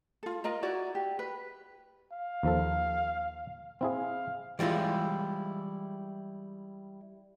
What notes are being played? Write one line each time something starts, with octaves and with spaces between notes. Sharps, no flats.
F4 A4
F4 A#4 D#5 A#5
E4 F#4 D5
G4
B4
F5
D#2 F3 A4
C4 E4 G#4 F5
E3 G3 G#3 E4 F4